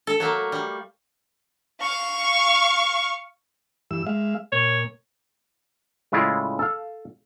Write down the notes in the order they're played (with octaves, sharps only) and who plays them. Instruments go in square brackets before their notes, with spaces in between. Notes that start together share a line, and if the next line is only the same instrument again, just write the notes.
[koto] A4
F#3 A3 A#3
G3
[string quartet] F5 C#6
[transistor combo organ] G2 E3 E6
G#3 E5 F5
[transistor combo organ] A#2 [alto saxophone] C#5
[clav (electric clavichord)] A2 C#3 G#3 E4 F4 D5
A4 F5